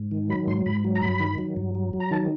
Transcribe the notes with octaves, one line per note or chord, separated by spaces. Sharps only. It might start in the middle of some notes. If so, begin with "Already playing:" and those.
Already playing: G#2
D#3
F#3 B5
G#2 C6
G#2 B5
F#3
A#5
G2 B5
D#3
F#3
G2
F#3
F#3
A#5
D#3 A5